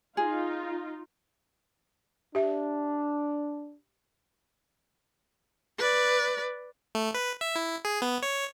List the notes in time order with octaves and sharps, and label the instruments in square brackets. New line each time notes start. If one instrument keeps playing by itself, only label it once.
[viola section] D#4 F4 [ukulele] G#4
[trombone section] D4 [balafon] G4 E5
[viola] B4 D5
[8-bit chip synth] A3
B4
E5
E4
G#4
B3
C#5